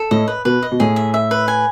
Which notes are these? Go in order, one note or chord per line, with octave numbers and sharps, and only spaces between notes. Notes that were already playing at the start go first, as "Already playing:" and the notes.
Already playing: A4
A2 D#5
B4
B2 B4
D#5
B2
A2 G#4
E5
E5
B4
G#5